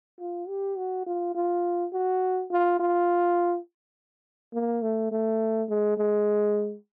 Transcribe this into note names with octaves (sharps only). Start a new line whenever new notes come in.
F4
G4
F#4
F4
F4
F#4
F4
F4
A#3
A3
A3
G#3
G#3